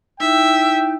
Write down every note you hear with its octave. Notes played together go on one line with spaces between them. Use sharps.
D#4 E4 E5 G5